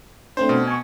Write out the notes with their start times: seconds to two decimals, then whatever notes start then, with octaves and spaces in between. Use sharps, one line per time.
0.37 A3 C4 D4 C5
0.49 B2
0.67 G#5 C#6